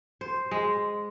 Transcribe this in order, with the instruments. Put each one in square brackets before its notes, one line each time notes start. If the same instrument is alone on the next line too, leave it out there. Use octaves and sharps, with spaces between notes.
[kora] C5
G#3